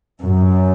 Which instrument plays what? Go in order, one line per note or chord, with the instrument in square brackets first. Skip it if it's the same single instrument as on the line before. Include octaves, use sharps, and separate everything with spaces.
[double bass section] F#2